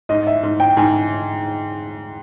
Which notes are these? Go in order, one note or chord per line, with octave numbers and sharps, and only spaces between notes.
G#2 D#5
E5
G#2
G5
G#2 G#5